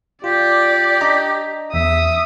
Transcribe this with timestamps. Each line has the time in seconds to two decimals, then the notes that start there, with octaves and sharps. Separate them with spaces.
0.24 F4 G4 D5
1.01 D4 D#5 A#5
1.74 E2 E5 D#6